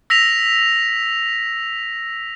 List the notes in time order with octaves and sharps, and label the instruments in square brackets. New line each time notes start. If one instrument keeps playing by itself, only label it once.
[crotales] E6 A#6 B6 F7